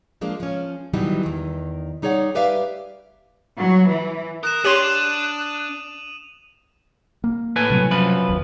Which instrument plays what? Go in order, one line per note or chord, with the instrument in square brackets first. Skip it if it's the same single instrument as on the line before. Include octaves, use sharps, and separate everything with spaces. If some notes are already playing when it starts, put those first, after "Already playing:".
[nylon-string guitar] F3 G#3 A#3 D4
F3 C#4
D#3 E3 F#3 G3 B3 D#4
E2 D#3
G3 D#4 G#4 C#5 D5 F#5
G4 B4 D5 E5 F5
[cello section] F#3
E3
[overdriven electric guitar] A#4 [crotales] D#6 E7 [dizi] F#6
[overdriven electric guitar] D4 [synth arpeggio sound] G4 C#5 C6 [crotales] D#7 F7 F#7
[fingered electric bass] A#3
[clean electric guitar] A2 B4 G#5
[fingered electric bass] C3 F#3 G3
[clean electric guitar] F#2 F3 B4
[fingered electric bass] F#1 E2 D#3